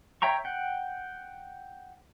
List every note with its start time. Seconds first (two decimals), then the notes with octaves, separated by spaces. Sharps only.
0.22 C#5 E5 G5 A#5 C#6
0.45 F#5 G5